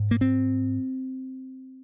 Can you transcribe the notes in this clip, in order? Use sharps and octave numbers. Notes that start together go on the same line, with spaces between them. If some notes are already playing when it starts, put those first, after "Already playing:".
Already playing: G#2
A#3
C4